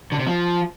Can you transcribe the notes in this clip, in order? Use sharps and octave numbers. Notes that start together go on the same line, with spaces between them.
D3
C3
F3